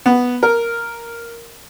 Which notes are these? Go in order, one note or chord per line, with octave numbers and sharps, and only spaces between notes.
B3
A#4